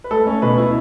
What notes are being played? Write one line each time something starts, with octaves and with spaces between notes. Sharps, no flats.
B4
A3 A4
C#4
B2 B4
E4